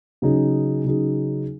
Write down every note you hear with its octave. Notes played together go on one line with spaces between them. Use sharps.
C#3 F#3 D#4 G#4
C#3 F#3 D#4 G#4